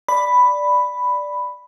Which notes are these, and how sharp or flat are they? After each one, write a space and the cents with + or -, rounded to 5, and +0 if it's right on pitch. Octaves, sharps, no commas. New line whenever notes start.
D5 +0 B5 +5